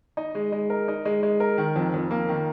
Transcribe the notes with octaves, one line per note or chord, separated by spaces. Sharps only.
D#4
G#3
G#3
A#4
D#4
G#3
G#3
A#4
D#3
F2
F2
A#3
D#3